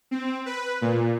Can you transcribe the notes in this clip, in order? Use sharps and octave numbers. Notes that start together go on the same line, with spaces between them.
C4
B4
A#2